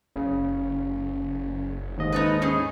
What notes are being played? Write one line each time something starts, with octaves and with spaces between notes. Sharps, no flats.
F#1 C#3
D#2 G#2 D#5
D#4 A4 B4
C#4 D#4 G#4